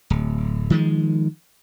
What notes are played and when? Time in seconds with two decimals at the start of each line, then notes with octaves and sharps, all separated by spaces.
0.10 D1
0.70 D#3 F3 G#3